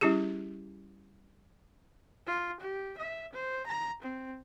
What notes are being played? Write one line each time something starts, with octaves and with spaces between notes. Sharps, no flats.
G3 C#4 E4 G4 G#4
F4
G4
E5
C5
A#5
C4